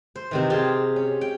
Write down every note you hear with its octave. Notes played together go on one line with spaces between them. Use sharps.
C5
C3 D#3 E3
F4 G4 G#4 C5
C#4
G5